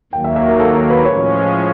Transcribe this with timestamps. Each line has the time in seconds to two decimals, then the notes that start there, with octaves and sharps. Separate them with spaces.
0.13 D#2 D#3 F#3 A#3 G5
0.24 E5
0.36 E5
0.48 A#4
0.60 A4
0.74 A#4
0.90 B4
1.05 A2 F3 G#3 C#4 C#5